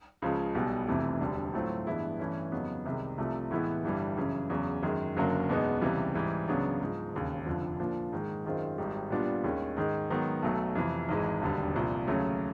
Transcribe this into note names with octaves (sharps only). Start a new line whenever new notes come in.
C#2 C#3 F3 G#3
B1 B2 G3 B3
F1 F2 C3 E3 A3
E1 D2 D3 G3
A2 F#3 A3 C4 F4
G2 E3 G#3 B3 E4
G2 E3 A3 C#4
F2 C#3 F#3 B3 D#4
C2 C3 D#3 G#3
C2 C3 F3 A3
A2 E3 G#3 B3 E4
G1 G2 E3 G3
F#2 C#3 E3
E2 C#3 F#3
F#2 D#3 G#3
F#1 F#2 D3 F#3 A#3
E2 B2 G#3 B3 D#4
C#2 C3 E3 G3
G#2 E3 G3
C#2 C#3 F#3 B3 D4
G#2 F3 G#3
E1 D#2 C#3
F1 F2 D3 F3
A#2 F3 A#3 D4
G#2 D#3 G#3
F#2 D#3 G#3 C4 F4
G#1 G#2 D#3 G3
A#2 G3 B3 D4 F4
D#2 D#3 G#3 C#4
G#2 D#3 G#3
G#2 D#3 F#3 B3
B1 B2 F#3 A3
F2 C3 E3
G#1 G#2 E3 G#3
E1 D#2 D3 G3
C2 A#2 F3
D#2 C#3 F#3 A3 C#4